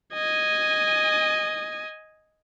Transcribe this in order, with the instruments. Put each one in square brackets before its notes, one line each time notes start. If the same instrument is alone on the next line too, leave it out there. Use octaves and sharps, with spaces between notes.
[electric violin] D#5 G#5